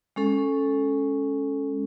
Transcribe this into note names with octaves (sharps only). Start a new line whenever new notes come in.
G#3 C#4 A4